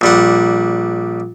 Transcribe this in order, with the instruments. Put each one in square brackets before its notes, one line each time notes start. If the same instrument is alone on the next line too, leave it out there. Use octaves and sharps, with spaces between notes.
[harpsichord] A#1 G3 F#5